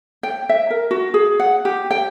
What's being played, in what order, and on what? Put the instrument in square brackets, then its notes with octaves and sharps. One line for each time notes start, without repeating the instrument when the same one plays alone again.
[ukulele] G5
E5
A#4
F#4
G#4
F#5
G4
G5